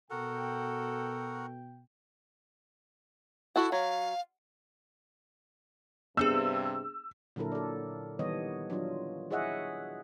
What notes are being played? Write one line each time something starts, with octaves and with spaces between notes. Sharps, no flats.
B2 F#4 A4 A#4 F#5 G5
E4 F#4 A4 F#5
F#3 F5
G2 C3 B3 D4 G#4 E6
A#2 D3 F#3 E4 A4 A#4
A4 D5
D#3 E3 G3 B3 C#5 D#5
F#3 D4 F4
E4 G#4 C#5 D#5 E5 F#5